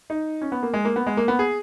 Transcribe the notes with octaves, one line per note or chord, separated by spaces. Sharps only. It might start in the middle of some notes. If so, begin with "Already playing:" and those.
D#4
C#4
B3
A#3
G#3
A#3
B3
G#3
A#3
B3
G#4